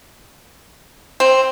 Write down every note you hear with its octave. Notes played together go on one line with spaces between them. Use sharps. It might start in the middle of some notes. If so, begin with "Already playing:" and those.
C4